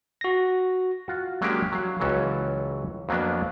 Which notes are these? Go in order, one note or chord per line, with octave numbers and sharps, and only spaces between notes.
F#4 A#6
F4 F#4
F#3 G#3 A#3 C#4 D4 G4
F#3 F5
C#2 E3 F#3 C#4 A4
F2 F#3 A#3 B3 D4